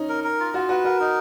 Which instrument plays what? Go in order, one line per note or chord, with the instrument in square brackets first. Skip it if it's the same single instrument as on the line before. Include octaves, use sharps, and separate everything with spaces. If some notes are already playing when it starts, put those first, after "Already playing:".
Already playing: [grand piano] C#4 D#4
[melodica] A#4
A#4
F4
[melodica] F4 [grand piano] F#4
[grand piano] F#4 [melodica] B4
[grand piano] F#4 [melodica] A#4
[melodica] D#4